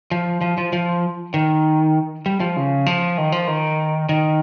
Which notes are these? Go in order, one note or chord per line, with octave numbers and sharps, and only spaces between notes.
F3
F3
F3
F3
D#3
G3
F3
C#3
F3
D#3
F3
D#3
D#3